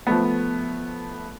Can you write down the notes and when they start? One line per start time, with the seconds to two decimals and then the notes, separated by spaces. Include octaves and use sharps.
0.07 F3 A3 B3